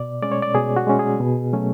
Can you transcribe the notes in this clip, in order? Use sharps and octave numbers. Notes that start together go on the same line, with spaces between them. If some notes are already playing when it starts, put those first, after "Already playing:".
Already playing: B2 D5
G#3 C#4 D5
C#5
D5
B2 G#4
F#4
G#3 C#4
G#4
B2
F#3 A3 C#4